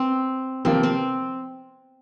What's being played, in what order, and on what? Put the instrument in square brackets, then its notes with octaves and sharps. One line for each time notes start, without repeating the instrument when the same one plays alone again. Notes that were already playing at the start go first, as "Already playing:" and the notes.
Already playing: [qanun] C4
[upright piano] C3 F3 A#3 [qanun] C4
[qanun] C4